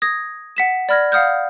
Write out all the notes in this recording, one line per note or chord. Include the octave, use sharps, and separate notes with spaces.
D#6 G#6 A#6
F#5 B6 E7
D5 B5 F6 G#6 A#6
F5 F#5 D#6 F6 G6